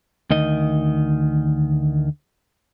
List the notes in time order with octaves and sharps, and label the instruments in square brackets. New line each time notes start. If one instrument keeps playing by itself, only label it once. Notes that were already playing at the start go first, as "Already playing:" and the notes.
[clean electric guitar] D2 D#3 D#5